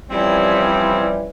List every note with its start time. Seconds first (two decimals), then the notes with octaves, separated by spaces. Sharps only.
0.10 E3 F3 G3 C4 C#4 E4